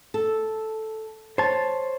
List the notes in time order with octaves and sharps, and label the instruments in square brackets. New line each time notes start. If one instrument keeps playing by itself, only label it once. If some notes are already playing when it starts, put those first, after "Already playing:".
[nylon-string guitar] A4
[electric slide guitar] C5 A5 [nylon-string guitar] C#5